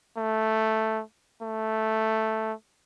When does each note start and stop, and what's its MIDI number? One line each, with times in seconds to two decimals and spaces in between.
0.17 1.02 57
1.42 2.53 57